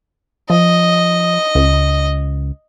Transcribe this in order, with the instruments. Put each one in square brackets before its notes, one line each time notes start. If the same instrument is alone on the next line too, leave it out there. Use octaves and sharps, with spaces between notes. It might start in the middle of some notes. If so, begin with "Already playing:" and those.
[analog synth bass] F3 [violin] D#5
[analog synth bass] C#2